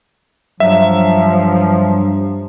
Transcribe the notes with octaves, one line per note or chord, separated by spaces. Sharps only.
G2 F3 F#3 E5